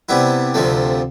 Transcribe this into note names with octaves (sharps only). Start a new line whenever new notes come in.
C3 G3 B3 E4
D2 C3 F3 A3